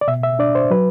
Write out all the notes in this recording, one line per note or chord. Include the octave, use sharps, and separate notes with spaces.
D5
B2 E5
E5
D4 D5
C5
F#3 B4